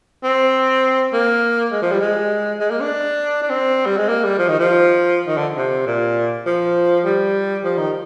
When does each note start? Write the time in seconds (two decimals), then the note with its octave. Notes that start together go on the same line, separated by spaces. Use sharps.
0.23 C4
1.13 A#3
1.72 G#3
1.82 F3
1.92 G3
2.01 G#3
2.60 G#3
2.71 A#3
2.80 D4
3.42 D4
3.50 C4
3.86 G3
3.97 G#3
4.08 A#3
4.24 G3
4.38 F3
4.48 D#3
4.59 F3
5.27 D#3
5.37 D3
5.56 C3
5.87 A#2
6.46 F3
7.05 G3
7.64 F3
7.77 D#3